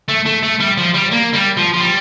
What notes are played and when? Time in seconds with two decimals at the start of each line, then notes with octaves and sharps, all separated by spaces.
0.09 A3
0.26 A3
0.43 A3
0.60 G3
0.78 F3
0.95 G3
1.13 A#3
1.35 G3
1.58 F3
1.74 F3
1.81 G3